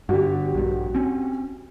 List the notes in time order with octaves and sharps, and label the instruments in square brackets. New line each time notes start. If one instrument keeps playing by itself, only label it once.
[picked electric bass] G2 D3 [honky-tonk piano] F#4 G4
[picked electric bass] A#1 G2
C4 C#4